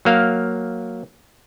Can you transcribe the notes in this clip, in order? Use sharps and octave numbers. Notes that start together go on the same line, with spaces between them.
F#3 A#3 F5